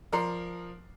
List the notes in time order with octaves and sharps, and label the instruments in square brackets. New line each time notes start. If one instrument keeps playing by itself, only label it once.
[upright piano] F3 A#4 D5 A#5 C6 C7